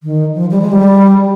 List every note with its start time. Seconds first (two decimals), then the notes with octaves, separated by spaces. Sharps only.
0.03 D#3
0.35 F3
0.51 G3
0.62 G#3
0.72 G3